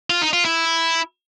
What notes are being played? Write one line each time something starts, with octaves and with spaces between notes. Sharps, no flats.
F4
D#4
F4
E4